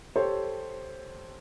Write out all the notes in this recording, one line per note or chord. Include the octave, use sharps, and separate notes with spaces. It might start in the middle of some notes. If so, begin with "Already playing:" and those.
G4 A4 C5 C#5